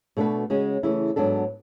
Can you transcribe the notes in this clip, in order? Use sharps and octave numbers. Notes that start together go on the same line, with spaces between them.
B2 A3 D4 F#4 B4
C#3 G#3 C#4 F#4
C#3 E3 A3 E4
G#2 F#3 B3 D4 A4